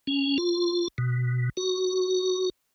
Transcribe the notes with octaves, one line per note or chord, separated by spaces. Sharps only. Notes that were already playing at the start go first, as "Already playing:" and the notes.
C#4
F4
B2
F#4